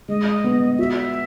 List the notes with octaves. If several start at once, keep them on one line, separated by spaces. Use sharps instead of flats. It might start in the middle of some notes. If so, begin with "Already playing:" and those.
G#3 D#5
B3
F#4 E5